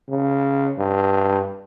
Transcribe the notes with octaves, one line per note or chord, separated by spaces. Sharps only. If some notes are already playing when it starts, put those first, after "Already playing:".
C#3
G2